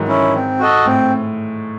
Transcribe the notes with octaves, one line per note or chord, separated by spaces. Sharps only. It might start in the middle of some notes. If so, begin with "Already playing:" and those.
Already playing: G#2 D#3 E3 F#3
C#4 E4
C4
F#4 A4 D#5
A2 C4